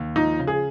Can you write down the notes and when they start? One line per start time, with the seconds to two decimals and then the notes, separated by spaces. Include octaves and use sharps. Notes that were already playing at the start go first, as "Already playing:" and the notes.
Already playing: D#2
0.16 F3 D#4
0.39 C#3
0.47 G#4